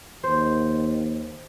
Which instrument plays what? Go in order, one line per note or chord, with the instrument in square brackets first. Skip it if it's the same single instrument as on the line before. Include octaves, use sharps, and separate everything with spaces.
[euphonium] D#2 [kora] C5